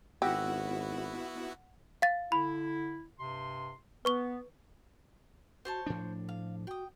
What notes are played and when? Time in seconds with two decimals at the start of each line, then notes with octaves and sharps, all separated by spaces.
0.22 G#1 B3 E4 F#4 G4 F#5 E6 A#6
2.02 F5 A6
2.32 D3 E4 B5
3.19 G2 C3 C6
4.05 B3 B4 C#6 G7
5.65 F#4 C5 C#5 A5
5.86 A2 F3 D4
6.29 F5
6.67 F#4 G5 D#6